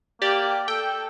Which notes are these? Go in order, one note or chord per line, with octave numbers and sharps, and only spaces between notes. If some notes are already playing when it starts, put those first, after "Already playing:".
A#3 G4 D5
A4 G5